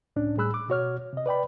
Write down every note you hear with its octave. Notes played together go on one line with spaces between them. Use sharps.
C#2 A2 C#4 D4
A2 G3 G#4 B5 E6 F#6
D6
B2 F#4 C#5 F6
C3 D#5
B4 D5 G5 B5